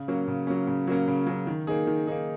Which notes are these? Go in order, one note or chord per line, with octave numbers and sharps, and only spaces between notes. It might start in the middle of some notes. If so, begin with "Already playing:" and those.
Already playing: C#3
F#3 A#3 C#4
C#3
F#3 A#3 C#4
C#3
F#3 A#3 C#4
C#3
F#3 A#3 C#4
D#3
A#3 D#4 G#4
D#3
A#3 D#4 G#4